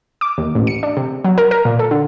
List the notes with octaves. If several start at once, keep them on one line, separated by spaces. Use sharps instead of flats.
D6
D#2
A1
C#7
D4
C3
F#3
A#4
A#4
A#2
A4
D3